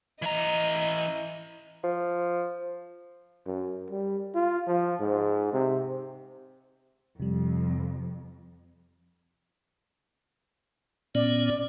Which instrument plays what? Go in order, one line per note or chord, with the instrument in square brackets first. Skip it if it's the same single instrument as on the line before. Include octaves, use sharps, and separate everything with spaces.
[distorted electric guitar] E3 A#5 [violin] D#5
[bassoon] F3
[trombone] F#2
G3
F4
F3
G#2
C3
[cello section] F2 [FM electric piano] C3 G3
[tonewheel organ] A#2 B3 C#4 [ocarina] D5